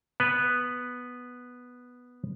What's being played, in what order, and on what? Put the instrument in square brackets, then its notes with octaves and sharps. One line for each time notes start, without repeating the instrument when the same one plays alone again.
[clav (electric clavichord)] B3 B4